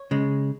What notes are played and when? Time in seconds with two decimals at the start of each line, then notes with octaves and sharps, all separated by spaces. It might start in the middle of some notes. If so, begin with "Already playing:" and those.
Already playing: C#5
0.11 C#3 G#3